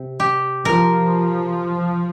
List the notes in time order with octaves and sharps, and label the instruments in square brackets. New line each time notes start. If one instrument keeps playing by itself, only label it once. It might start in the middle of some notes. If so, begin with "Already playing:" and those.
Already playing: [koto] C3
G4
[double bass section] F3 [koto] A#4